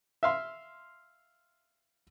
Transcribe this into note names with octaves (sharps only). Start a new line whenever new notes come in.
E5 F5 C6